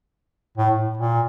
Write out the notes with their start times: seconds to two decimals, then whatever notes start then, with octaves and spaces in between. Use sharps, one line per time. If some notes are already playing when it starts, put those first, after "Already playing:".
0.58 A2
0.97 A#2